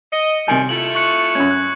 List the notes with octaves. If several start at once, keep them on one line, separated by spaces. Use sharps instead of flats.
D#5 C#7
F#2 C3 D#3 G3 G#5
A3 E4 F4 F#7
C#6 F#6 C#7
F#2 C#4 G#6
F#6